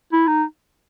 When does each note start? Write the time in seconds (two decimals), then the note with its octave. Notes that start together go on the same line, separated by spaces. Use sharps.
0.12 E4
0.27 D#4